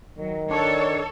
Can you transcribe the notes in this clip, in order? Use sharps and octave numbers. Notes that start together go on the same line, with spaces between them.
D#3 F#3
D4 A4 C#5